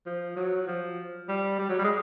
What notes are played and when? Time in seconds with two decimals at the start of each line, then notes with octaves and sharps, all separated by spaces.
0.06 F3
0.36 F#3
0.67 F3
1.29 G3
1.59 G3
1.69 F#3
1.79 G3
1.84 G#3